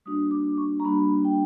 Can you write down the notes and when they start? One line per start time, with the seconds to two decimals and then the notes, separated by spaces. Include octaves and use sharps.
0.05 G3 A#3 D4 F#4 D#6
0.31 D6
0.58 C#6
0.80 A#5
0.84 G3 A#3 D4 F#4 B5
1.25 G5